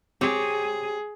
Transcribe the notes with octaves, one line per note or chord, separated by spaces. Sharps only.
C4 G4 G#4 C#5